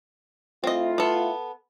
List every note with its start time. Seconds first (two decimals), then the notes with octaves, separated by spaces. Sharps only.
0.64 A3 C4 E4 F4 D#5
0.98 B3 A4